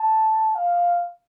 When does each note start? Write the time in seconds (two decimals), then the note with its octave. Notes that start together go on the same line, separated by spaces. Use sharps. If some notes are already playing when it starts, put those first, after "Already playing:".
Already playing: A5
0.56 F5